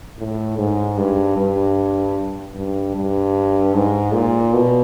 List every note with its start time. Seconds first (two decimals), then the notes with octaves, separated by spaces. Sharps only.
0.19 A2
0.58 G#2
0.97 G2
1.37 G2
2.55 G2
2.96 G2
3.74 G#2
4.13 A#2
4.53 B2